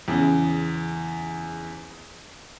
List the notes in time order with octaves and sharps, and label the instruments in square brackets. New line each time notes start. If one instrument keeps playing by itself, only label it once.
[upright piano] E2 C#3